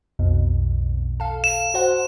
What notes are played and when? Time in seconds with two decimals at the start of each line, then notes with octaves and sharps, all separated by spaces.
0.19 B1 F2 B2
1.20 A4 F5
1.44 E7
1.74 F#4 C5 F#5